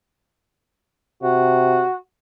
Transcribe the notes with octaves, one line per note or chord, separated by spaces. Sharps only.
C3 F#4